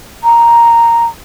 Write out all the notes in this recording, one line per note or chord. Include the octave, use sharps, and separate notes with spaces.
A#5